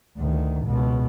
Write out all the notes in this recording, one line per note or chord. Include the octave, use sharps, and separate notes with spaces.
D2 D#3
C#2 B2